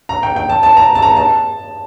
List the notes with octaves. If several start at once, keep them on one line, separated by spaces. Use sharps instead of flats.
A#5
G5
G5
A5
A5
A#5
A5
A#5
A5